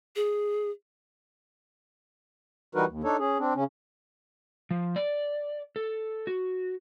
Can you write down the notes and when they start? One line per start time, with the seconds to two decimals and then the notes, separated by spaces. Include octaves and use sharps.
0.16 G#4
2.75 E3 G3 D#4 F#4 A#4 B4
2.87 D#2
3.04 D4 D#4 A4 C#5
3.19 C#4 G#4
3.38 C4 D4
3.55 C#3 C#4
4.71 F3
4.96 D5
5.76 A4
6.27 F#4